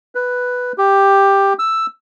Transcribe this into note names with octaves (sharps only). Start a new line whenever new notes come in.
B4
G4
E6